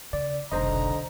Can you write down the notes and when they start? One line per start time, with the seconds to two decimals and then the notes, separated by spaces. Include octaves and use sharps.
0.13 C#3 D5
0.52 F1 B1 D3 C5 D#5 A#5